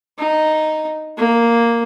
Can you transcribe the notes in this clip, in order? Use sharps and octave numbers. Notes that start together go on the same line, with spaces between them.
D#4
A#3